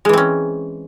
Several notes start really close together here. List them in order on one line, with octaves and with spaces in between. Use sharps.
G#3 E3 C4 C#4